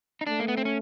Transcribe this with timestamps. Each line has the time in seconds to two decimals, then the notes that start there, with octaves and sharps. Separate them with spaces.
0.21 D#4
0.27 A3 D4
0.40 A#3
0.48 B3
0.57 C4
0.65 C#4